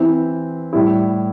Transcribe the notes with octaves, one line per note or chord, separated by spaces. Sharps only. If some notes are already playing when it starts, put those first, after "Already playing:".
Already playing: E3 C4 E4
A2 G3 E4